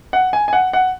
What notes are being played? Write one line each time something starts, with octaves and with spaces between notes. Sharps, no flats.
F#5
G#5
G#5
F#5
F#5